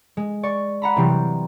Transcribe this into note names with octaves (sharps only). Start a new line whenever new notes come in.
G#3
D5 C#6
F#5 A#5 B5
C3 E3 F#3 G3 C4 G4